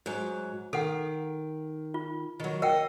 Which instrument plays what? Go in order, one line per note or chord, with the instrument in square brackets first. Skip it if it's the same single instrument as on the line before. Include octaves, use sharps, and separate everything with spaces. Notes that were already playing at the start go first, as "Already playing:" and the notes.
[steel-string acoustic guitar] G#2 F#3
[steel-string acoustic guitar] D#3 [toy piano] A4 F#5
[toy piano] F4
[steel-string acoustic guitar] D#3 F#3
[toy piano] A#4 F#5 G5 [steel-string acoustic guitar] D#5